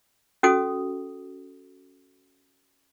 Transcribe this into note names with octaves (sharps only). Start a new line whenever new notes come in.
C#4 F#4 A4 D#6